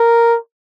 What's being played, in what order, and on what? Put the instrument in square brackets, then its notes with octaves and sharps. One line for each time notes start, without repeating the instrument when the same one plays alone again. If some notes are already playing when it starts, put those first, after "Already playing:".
Already playing: [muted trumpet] A#4